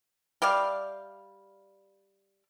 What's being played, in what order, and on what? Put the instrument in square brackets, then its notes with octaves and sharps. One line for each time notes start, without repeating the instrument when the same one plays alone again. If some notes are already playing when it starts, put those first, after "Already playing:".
[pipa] G3 D5 E5 F5